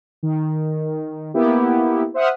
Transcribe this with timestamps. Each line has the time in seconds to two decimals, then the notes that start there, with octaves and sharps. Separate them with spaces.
0.23 D#3
1.34 A#3 B3 E4 G4
2.14 C5 E5 F#5 D#6 F6